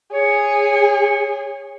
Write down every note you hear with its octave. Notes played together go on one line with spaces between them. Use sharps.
G#4 C#5